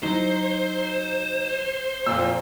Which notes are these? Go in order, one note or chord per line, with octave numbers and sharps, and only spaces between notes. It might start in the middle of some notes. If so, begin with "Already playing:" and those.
F#3 D#4 C5
F2 A#2 E6